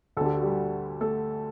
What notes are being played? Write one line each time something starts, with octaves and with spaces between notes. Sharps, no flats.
D2 D3 G4 A4
F#4
G3 G4
A3 A4